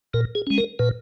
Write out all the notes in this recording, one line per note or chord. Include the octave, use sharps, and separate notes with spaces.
A#2 A#4
G#4
G#3 C#4
A#4
A#2 B4